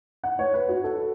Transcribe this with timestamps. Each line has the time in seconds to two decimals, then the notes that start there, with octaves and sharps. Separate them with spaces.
0.23 F#5
0.39 C#5
0.54 B4
0.69 F#4
0.84 A4